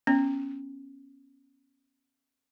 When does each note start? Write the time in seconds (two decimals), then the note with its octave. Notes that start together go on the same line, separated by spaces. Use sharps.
0.07 B3 C#4